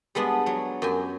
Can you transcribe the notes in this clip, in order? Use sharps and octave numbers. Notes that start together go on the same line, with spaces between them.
G3 G#3 B3 D4
F#3 C#5
F#2 G4 G#5